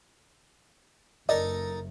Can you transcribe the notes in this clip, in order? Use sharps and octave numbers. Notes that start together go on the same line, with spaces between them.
F#1 D#4 A4 A#4 D5 D#5